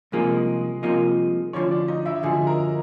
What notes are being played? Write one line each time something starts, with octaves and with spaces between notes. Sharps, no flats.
C2 C3 F3 G#3 A#3 D#4 G#4
C2 C3 F3 A#3 D#4
D2 D3 F3 C#4 C#5
D4 D5
D#4 D#5
E4 E5
D2 D3 F3 G#4 G#5
A#4 A#5